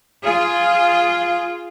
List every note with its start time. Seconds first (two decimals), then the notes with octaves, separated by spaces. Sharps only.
0.22 F4 G#4